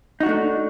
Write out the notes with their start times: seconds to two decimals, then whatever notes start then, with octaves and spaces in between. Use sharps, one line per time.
0.20 D#4
0.23 F#4
0.26 D4
0.29 A3